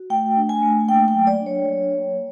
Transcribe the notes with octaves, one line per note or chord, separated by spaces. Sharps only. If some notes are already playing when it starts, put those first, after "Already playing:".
Already playing: F#4
A3 G5
D4
G#5
A3
A#3 G5
G5
F#3
D5
D4
C#5
F#3
A#3